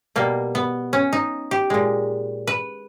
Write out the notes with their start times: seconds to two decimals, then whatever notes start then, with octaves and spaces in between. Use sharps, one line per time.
0.16 B2 G3 A#3
0.55 B3
0.93 C#4
1.13 D#4
1.51 G4
1.70 A#2 G#3
2.47 B4